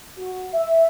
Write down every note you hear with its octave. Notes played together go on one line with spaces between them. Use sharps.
F#4
E5